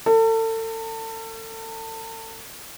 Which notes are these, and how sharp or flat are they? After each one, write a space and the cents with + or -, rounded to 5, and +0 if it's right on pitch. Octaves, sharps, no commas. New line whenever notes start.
A4 +35